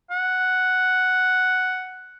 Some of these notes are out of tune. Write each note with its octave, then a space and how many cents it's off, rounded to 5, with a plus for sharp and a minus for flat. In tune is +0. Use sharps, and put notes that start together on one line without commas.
F#5 +0